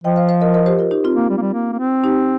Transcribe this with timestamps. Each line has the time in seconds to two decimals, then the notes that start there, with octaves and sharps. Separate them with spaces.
0.04 F3 D#5 G5
0.16 C5 F5
0.29 C5 F5
0.41 A#4 D#5
0.54 A#4 D#5
0.66 G4 C5
0.79 F4 A#4
0.91 D#4 G4
1.04 C4 F4
1.16 A#3
1.30 G3
1.38 A#3
1.42 G3
1.54 A#3
1.73 A#3
1.79 C4
2.04 D#4 G4